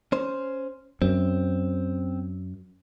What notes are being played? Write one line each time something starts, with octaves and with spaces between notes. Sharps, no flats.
C#4 C5
F#2 C4